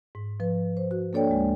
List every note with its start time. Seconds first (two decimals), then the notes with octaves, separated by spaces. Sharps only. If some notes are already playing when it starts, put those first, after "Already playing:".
0.15 G#2
0.40 F3 B4
0.77 C5
0.91 F#4
1.13 A#3 D4 A4 C#5 D5 G5
1.28 D2 G#3